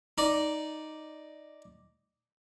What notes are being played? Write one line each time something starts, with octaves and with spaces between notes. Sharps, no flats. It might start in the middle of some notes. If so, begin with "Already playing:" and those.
D#4 D5